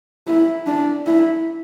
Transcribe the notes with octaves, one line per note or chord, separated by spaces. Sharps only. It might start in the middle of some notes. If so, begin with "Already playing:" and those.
E4
D4
E4